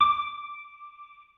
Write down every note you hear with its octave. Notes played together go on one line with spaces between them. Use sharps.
D6